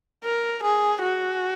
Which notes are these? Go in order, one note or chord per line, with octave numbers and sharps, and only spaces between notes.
A#4
G#4
F#4